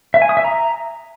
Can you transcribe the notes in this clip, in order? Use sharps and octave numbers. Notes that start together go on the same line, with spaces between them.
E5
G#5
D#6
E5
A#5